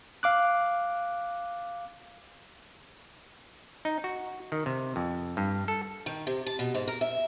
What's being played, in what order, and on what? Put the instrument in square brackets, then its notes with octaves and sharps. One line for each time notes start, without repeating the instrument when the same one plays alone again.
[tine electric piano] F5 D6 F#6
[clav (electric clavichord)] D#4
F#4
D#3
C3
F2
G2
A4
[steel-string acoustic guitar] D#3
C3
A5
B2
G#2
A#4
E5